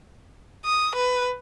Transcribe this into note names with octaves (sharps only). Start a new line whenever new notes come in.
D#6
B4